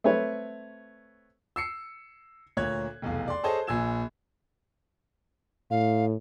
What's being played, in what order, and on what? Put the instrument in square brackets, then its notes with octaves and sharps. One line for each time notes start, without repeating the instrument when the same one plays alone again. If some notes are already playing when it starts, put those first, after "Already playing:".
[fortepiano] A3 C4 B4 C#5
[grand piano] E6 C7 C#7
D2 A#2 A#3 C#5 F#6 G#6
F1 B1 E2 F5
D5 C6
G#4 A4 C5 C#5 D#5 A5
A#1 A#2 G#5 E6 G#6 E7
[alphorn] A2 [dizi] F5